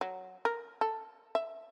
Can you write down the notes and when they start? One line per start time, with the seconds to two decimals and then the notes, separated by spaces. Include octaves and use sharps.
0.01 F#3
0.45 A#4
0.81 A4
1.35 E5